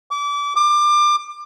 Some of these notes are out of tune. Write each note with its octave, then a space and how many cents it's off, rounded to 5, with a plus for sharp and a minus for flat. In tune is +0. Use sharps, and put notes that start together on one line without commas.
D6 -30
D6 +25